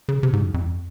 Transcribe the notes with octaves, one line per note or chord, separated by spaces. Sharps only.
C#3
C3
G#2
F#2
F2